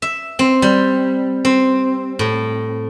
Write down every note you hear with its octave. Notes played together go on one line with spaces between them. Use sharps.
E5
C4
G3
C4
A2